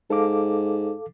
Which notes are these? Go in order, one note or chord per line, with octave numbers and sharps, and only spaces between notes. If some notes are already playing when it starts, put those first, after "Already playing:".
G#2 A4 F5 D6